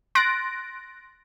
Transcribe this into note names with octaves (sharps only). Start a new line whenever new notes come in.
C6 F#6 A6 A#6 D7